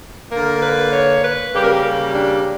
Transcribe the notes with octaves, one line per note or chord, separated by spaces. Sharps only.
D3 A#3 A#4
B4
C#5
B4
C#3 G3 A#3 G4
A#4
G4
D4